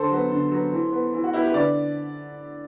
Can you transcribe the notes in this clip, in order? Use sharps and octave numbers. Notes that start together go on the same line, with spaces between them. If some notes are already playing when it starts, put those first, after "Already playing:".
Already playing: D3 A4 C5
F#3 B3
D3
F#3 B3
E3
B3
E3
F#4
B3 E4 G4
G4 B4
D3 B4 D5